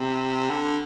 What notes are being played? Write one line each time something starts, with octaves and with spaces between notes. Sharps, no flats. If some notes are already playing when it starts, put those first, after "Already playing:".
Already playing: C3
D3